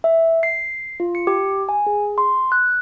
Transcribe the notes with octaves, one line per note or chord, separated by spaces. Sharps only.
E5
C7
F4
C#7
G4
G#5
G#4
C6
F#6